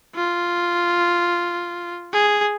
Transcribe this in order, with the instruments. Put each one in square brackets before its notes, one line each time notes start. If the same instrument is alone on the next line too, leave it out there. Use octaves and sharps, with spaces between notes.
[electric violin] F4
G#4